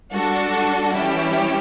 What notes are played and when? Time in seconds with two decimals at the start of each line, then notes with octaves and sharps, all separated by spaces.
0.13 G3 D4 F#4 A4
0.94 E3 G3 C#4 E4 G4